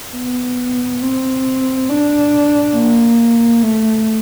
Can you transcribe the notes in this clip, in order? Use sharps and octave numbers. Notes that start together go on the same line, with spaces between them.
B3
C4
D4
A#3
A3